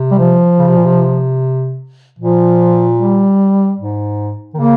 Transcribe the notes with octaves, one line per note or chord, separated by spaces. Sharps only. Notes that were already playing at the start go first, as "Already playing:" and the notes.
Already playing: C3
G3
F3
C#3
C3
A#2
C3
A#2 F3
G3
G#2
D#3
C#3 A#3